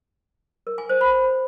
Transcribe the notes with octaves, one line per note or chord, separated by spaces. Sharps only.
A#4
G#5
C5
B5